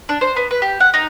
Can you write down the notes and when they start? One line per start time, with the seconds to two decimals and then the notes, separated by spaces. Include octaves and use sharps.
0.09 D4
0.21 C5
0.36 B3
0.51 B4
0.62 G4
0.80 F#5
0.94 D#4